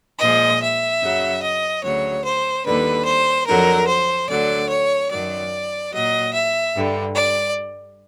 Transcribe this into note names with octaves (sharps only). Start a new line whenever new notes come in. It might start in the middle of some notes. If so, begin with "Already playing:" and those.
A#2 F3 G#3 D#5
E5
F#2 C#3 F#3
D#5
D2 C#3 F#3 C#5
C5
D#2 D3 G3 B4
C5
F2 D3 F#3 A#4
C5
D2 D3 F#3 D5
C#5
F#2 D#3 F#3 D5
A#2 F#3 D#5
E5
G2 D3 G3
D5